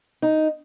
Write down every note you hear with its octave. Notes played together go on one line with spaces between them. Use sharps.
D#4